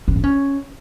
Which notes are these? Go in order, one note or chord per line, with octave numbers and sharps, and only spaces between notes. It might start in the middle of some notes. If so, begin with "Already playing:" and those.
C#4
D4
C#4